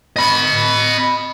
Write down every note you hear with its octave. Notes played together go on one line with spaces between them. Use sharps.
D#5 B5